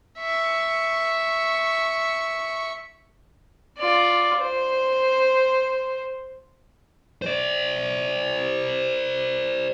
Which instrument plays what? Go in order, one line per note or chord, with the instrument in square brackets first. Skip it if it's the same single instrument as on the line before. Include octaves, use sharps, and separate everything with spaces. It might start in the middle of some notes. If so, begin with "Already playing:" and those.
[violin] E5 C#6
[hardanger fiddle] F4 D5
C5
[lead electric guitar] C5 D5